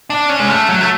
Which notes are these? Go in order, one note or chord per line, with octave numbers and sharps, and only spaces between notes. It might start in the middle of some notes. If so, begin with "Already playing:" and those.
D4
C#4
G#3
A3
F#3
A3